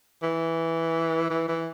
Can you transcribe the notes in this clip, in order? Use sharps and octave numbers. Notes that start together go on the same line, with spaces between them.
E3
E3
E3